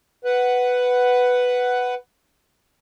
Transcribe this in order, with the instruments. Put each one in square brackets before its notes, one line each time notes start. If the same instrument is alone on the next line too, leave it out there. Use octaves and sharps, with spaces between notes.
[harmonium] B4 F#5